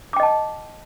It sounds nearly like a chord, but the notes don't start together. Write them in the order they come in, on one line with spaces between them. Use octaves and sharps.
D6 G5 D#5 A5